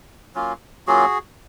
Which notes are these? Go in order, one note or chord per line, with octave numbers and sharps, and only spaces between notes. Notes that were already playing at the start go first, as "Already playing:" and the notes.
F#3 A#3 C#4 F4
F#3 A#3 C#4 F4 F#4 G#4